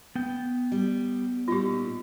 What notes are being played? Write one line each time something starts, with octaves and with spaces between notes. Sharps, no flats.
B3 G5
G3
A#2 G3 D#4 F4 G4